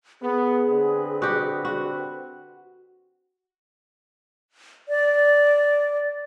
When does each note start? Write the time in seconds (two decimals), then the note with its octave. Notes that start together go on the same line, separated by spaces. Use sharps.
0.22 B3 G#4
0.68 D3 C4 B4
1.22 F#4 G4
1.65 F#4
4.89 D5